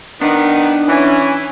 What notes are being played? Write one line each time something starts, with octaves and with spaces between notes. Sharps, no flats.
D#3 B3 D4 D#4
E3 C#4